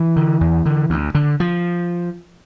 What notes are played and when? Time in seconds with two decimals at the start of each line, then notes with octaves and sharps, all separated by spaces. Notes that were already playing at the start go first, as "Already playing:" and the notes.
Already playing: E3
0.16 D3
0.41 E2
0.66 D3
0.90 D2
1.15 D3
1.40 F3